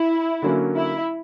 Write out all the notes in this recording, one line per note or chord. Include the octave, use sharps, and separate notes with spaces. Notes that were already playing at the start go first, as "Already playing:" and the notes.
Already playing: E4
D3 F#3 A#3 C#4
E4